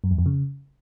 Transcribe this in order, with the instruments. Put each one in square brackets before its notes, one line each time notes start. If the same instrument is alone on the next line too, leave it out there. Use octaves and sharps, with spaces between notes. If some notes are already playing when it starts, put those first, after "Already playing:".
[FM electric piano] F#2
E2
F2
C#3